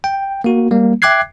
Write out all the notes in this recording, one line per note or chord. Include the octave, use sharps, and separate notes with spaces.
G5
A#3 F#4
G3 A#3
E5 G5 D6 F#6 G#6 C7